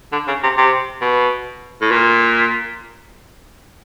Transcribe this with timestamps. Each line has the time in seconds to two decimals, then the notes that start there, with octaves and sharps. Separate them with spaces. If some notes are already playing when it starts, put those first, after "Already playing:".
0.12 D3
0.28 C#3
0.43 C3
0.57 C3
1.01 B2
1.81 A2
1.91 A#2